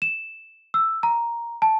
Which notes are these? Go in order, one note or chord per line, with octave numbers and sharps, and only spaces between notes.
E7
E6
A#5
A5